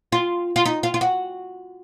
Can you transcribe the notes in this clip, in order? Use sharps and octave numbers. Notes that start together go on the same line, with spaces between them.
F4
F4
D#4
F4
F4
F#4